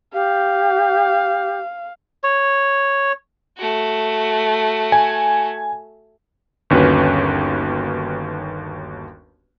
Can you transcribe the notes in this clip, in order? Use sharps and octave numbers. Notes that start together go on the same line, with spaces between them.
G4 F5
C#5
A3 F#4
G#5
G1 D#2 C#4 F#4 B4